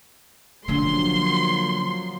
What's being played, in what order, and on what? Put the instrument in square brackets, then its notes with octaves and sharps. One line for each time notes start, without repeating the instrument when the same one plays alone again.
[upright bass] D3 C#4 [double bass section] F3 F#3 A#3 [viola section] C6